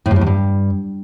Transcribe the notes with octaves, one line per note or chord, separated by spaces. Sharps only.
A2
G2
A2
E2
G2